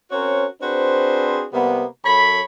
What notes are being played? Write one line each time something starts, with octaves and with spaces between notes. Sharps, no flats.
C4 C#4 F#4 A#4 C5 C#5
C4 D4 F#4 G#4 B4 C5
C3 G3 A#3 B3
F#2 A4 C#5 B5